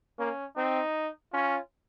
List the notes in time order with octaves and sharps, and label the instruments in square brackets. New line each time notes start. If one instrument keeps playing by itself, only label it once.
[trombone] A#3 [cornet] C#4
[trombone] C4 [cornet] D#4
[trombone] C#4 [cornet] F4